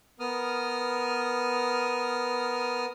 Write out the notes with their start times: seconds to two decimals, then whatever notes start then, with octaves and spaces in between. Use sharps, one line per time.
0.20 B3 A#4 D#6 F6